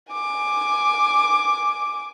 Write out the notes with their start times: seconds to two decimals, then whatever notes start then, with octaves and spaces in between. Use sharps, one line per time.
0.13 G#5 D6